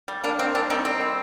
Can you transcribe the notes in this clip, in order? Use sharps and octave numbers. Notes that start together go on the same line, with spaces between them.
G3
A#3 D4
D#3 C4
G3 D4
D#3 C4 D#4
G3 C4
D#3